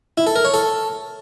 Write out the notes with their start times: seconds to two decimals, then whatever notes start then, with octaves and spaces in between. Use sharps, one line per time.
0.18 E4
0.27 A4
0.36 A#4
0.45 C#5
0.54 A4